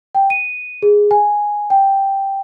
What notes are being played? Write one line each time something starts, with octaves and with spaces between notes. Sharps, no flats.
G5
D#7
G#4
G#5
G5